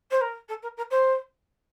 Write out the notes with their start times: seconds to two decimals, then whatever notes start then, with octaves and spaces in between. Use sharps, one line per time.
0.11 C5
0.21 A#4
0.48 A4
0.62 A#4
0.77 A#4
0.91 C5